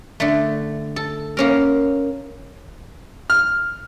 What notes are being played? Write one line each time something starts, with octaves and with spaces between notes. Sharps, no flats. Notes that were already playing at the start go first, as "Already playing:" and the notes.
D3 A3
A4
A#3 C#4 A#4
F6